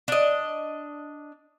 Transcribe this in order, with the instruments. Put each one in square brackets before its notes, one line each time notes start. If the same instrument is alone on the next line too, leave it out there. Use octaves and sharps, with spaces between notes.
[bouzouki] D4 D#5